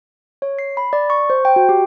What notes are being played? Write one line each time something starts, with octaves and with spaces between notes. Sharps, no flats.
C#5
C7
B5
D5
C#6
C5
G5
F#4
G4